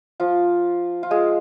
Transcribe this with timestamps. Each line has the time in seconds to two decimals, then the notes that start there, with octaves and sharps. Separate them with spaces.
0.20 F3 F4
1.03 F4
1.11 G#3 G#4